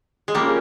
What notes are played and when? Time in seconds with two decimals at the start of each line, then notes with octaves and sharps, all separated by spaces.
0.28 G#3
0.34 G3 A#3 C#4 F4 A#4